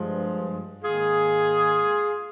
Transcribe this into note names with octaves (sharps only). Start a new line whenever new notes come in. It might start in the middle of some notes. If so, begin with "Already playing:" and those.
Already playing: G2 F3 G#3
G#2 D#3 A#3 F4 G#4